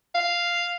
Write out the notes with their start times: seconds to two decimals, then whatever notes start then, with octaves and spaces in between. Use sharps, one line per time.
0.15 F5